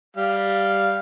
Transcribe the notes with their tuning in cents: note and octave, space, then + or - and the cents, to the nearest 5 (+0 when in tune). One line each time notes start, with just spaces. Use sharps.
G3 +0 F5 -5